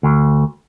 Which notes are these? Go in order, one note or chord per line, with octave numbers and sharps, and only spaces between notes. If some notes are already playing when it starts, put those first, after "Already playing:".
D2